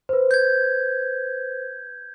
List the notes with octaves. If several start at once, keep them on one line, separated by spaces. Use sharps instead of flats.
B4 C5
G6 G#6